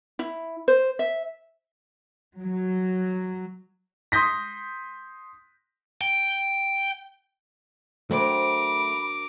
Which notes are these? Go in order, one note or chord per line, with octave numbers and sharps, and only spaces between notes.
E4
C5
E5
F#3
C6 D#6 G6 A#6 B6
G5
F#3 A3 C4 D4 A#4 B5 D6